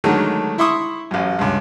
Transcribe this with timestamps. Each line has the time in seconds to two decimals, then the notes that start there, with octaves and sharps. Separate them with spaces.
0.04 D3 D#3 F#3 G#3 A3
0.58 E4 E5 C6 C#6 D#6
1.11 A1 F#2
1.39 C#2 G2